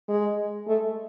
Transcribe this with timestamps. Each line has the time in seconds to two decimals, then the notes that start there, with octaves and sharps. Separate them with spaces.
0.09 G#3
0.68 A3